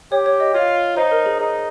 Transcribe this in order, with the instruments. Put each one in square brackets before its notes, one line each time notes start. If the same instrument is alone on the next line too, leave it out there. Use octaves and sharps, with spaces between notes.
[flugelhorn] G4 [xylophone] C#5
[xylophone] C#5
D#5
[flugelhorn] F4 [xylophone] C#5
[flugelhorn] D#4 [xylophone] C5
[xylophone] A#4
G#4
[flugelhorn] D#4 [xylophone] G#4